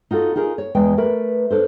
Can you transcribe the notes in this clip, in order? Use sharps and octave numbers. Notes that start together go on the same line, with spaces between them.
D#4 F4 F#4 A4
D#4 F4 G#4 A#4
C#5
E2 G#3 G5 G#5
A3 A#4 B4
D4 A4 C5